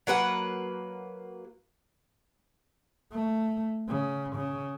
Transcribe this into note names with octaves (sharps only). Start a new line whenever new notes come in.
F#3 A#3 B4 F#5
A3
C#3
C#3